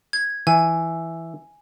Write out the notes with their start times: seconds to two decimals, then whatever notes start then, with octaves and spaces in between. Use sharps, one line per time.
0.13 G#6
0.47 E3 G#5